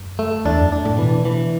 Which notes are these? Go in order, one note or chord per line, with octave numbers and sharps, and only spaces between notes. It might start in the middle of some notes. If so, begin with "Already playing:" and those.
Already playing: F#2
A3
E2 D4
F#2
D4
A2
B2 E3
E3